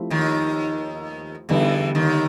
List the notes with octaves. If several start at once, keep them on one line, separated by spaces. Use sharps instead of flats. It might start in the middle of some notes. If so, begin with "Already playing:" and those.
Already playing: F3 A3 C4 E4 G4
D#2 D#3
E2 D3 E3 G3 B3 D#4 G4
D#2 D#3